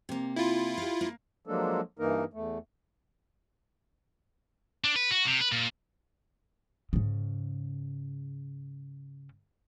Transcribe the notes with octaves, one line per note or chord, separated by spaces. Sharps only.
C3 A#3
E4 F4
G4 F5
A#3
F3 F#3 G#3 A#3 D4 A4
G2 E3 A#3 D#4 A#4
E2 A3
D4
B4
F#4
C3
B4
A#2
G#2 C#3